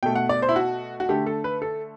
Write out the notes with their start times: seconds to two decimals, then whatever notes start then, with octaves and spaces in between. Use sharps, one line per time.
0.03 B2 A3 G5
0.15 F#5
0.29 D5
0.42 C5
0.49 E4
0.56 F#4
1.00 F#4
1.09 D3 A3 G4
1.26 A4
1.44 B4
1.62 A4